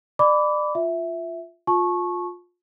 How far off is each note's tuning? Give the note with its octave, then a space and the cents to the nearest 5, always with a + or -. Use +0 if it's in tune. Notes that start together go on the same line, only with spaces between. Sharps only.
D5 +30 B5 +10 D6 -20
F4 +0 E5 +0
F4 +25 A5 -30 C#6 -15